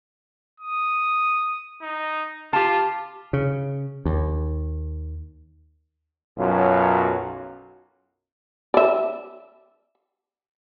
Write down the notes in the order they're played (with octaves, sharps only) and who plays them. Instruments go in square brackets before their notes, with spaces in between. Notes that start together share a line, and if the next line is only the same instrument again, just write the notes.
[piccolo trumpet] D#6
D#4
[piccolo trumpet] F4 [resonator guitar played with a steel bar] G4 A5
[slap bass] C#3
D#2
[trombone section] B1 F#2 F#3 F4
[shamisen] D5 E5